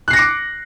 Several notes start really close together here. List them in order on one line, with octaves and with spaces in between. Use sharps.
F#6 C7 A#6 C#7 D6